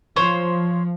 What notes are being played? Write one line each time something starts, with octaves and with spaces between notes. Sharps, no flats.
F3 C5 C#5